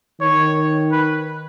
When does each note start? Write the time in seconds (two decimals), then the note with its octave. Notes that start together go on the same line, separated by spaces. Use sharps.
0.21 D#3 C#5
0.92 B4